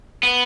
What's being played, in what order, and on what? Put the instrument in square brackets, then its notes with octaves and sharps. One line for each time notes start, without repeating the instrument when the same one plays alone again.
[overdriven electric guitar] B3